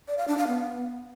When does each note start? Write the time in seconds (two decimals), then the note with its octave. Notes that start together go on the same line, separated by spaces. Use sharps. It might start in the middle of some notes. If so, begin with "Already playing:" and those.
0.08 D5
0.18 F5
0.28 D4
0.38 F5
0.48 B3